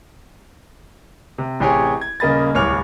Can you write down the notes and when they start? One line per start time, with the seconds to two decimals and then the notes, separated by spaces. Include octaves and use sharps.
1.38 C3
1.60 A1 C3 G4 G#4 C#5 G#5
2.01 G#6
2.20 D#1 C#3 A#3 D#5 B5 A6
2.55 D1 C2 C#5 D6 F6 F7